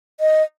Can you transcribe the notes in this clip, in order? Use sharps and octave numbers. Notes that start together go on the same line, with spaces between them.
D#5